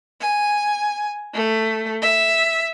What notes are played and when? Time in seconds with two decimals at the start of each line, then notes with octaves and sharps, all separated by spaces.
0.21 G#5
1.35 A3
2.02 E5